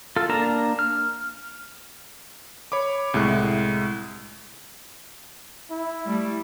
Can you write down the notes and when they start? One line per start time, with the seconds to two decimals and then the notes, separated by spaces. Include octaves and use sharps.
0.16 F4 A4
0.29 A#3 D4 A#4 A5 A#5
0.79 F6
2.72 C#5 B5 D6
3.14 C2 A2 G#3 F#6
5.71 E4
6.06 G3 A3